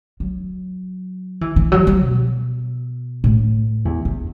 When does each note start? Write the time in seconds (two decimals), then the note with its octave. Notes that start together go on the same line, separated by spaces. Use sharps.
0.20 F#3
1.41 E3
1.56 E3
1.72 F#3
1.87 G3
2.03 B2
3.24 A2
3.85 E2
4.05 E2